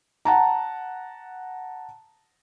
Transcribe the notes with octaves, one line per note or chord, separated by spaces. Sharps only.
F#5 A5 A#5